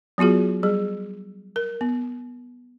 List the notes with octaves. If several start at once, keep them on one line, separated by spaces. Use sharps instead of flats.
F#3 B3 F4 F#4 G#4
G3 G#4
A#4
B3